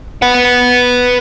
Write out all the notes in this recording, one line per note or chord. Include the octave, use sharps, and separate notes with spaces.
B4 F#5